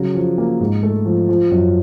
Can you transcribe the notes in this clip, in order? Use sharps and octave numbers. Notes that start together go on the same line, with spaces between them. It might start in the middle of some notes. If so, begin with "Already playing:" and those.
Already playing: C#3 F#3
F3
A#3
G#2
A3
F3
F3
F#2